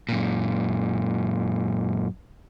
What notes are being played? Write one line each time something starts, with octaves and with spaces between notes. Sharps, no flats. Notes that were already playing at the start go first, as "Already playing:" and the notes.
F#2 A#2